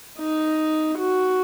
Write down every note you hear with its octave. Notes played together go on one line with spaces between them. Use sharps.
D#4
F#4